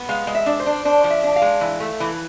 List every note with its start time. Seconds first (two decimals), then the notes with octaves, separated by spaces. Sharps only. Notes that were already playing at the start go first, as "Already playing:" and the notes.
Already playing: B3
0.09 G#3 F5
0.27 G#3
0.35 E5
0.46 D4
0.60 C5
0.66 D4
0.85 D4 C5
1.04 F3
1.10 E5
1.24 D4
1.36 F5
1.42 G#3
1.61 E3
1.80 A3
2.00 E3